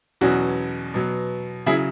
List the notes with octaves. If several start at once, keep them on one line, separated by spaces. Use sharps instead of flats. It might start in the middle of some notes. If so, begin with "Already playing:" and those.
E2 B2 F#3 B3 C#4 F#4
B2 F#3 B3
C#3 F#3 E4 G#4